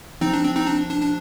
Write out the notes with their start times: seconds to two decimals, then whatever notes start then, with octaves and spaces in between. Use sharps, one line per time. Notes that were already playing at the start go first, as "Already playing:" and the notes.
0.21 F3 C4 D#4
0.33 D4
0.44 C4
0.55 C4 D#4
0.67 D4
0.91 D4
1.02 D4